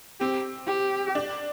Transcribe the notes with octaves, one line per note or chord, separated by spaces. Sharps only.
C4 G4
G4
D4